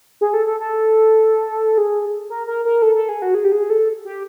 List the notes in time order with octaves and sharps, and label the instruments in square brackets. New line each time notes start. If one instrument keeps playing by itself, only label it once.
[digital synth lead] G#4
A4
A4
A4
G#4
A#4
A#4
A#4
A4
A4
G#4
F#4
G#4
G4
G#4
A4
G4